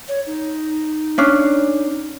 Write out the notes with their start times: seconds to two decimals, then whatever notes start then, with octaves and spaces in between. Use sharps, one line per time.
0.08 C#5
0.26 D#4
1.18 C#4 D4